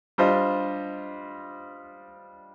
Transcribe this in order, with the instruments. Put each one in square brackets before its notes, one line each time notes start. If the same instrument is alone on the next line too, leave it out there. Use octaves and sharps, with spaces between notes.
[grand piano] G3 D4 F4 C5 D#5